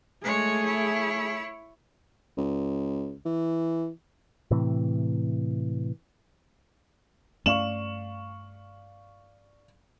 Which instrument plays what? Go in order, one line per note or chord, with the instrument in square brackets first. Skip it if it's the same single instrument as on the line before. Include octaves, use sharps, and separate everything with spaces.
[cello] G#3 C#5 [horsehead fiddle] A3 G#4
[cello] E4 C#5
[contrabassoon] C#2
E3
[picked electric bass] A2 C3 E3
[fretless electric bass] G2 A3 C#4 [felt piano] D5 F5 C#6 [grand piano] E7 F#7